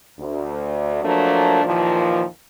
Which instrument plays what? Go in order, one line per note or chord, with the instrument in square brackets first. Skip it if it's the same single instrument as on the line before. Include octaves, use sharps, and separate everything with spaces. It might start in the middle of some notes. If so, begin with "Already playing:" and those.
[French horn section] D2
F3 F#3 A3 A#3 D4
D#2 A#2 E3 F3